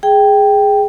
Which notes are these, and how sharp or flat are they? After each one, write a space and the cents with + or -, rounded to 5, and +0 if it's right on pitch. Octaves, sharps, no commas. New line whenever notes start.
G#4 +0 G5 +0